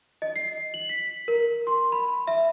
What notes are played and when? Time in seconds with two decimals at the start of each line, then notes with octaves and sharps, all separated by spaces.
0.22 D#5
0.36 C7
0.74 F#7
0.89 B6
1.28 A#4
1.67 C6
1.92 B5
2.27 E5